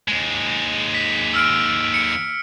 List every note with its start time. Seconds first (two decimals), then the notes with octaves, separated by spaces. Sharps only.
0.08 D#2 G#3
0.94 B6
1.34 E6 F6 D7
1.94 C#7